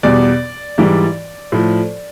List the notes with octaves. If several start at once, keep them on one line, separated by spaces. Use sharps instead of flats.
E2 B2 G3 D5
G#2 E3 G3
A2 F3